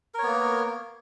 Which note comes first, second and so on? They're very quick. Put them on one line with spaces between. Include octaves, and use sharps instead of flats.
A#4 C#5 B3 A#3